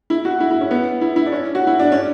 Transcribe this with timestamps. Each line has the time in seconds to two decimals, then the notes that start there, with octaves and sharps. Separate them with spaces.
0.10 E4
0.25 F#4
0.40 E4
0.51 E4
0.61 C#4
0.71 B3
1.01 E4
1.16 E4
1.26 D4
1.32 C#4
1.55 F#4
1.67 E4
1.80 D4
1.92 C#4